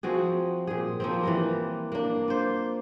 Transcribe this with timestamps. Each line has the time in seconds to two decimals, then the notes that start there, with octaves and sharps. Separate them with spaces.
0.03 F3 C4 F#4 G#4
0.67 A#2 G#4
1.00 F3 A#3 C4
1.23 E3 G3 A#4
1.92 A#3 D4
2.28 F4 C5